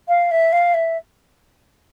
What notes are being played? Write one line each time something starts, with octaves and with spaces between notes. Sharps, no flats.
F5
E5
F5
E5